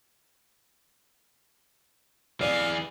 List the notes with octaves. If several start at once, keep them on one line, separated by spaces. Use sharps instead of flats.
E3 G#4 D5 F5